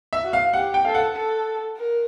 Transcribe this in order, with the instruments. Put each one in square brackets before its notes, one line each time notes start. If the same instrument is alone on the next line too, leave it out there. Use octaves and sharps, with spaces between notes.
[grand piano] E5
[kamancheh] F#4
[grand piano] F5
[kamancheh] G4 [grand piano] F#5
[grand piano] G5
[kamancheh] A4 [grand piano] F5
[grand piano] F#5
[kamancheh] A4
A#4